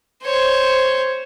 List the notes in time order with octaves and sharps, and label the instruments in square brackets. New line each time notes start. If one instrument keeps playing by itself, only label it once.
[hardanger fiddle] C5 C#5